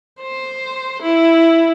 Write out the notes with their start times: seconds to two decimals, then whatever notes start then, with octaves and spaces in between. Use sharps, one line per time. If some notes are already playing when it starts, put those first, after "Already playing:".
0.20 C5
1.01 E4